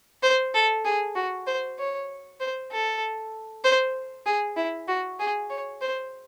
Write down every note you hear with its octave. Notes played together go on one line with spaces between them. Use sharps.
C5
A4
G#4
F#4
C5
C#5
C5
A4
C5
G#4
E4
F#4
G#4
C#5
C5